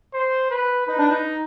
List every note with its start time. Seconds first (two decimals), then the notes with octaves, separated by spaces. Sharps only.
0.13 C5
0.50 B4
0.87 D#4 B4
0.97 D4
1.10 D#4